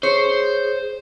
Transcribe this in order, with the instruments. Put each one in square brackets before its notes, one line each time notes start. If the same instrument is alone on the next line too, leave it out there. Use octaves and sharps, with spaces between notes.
[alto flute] G#4 [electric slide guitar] C5 [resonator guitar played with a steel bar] C#5